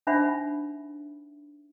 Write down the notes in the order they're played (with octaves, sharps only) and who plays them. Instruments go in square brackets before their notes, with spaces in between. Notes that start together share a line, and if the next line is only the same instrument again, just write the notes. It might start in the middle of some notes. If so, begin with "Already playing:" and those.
[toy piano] D4 D#4 C5 E5 F#5 B5